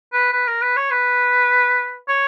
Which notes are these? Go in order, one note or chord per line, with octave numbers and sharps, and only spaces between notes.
B4
B4
A#4
B4
C#5
B4
C#5